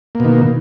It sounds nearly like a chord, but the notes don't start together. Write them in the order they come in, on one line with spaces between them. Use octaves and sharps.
A#3 B2 D#3